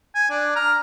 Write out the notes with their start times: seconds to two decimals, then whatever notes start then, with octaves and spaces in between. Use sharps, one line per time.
0.15 G#5
0.30 D4
0.56 A#5 F6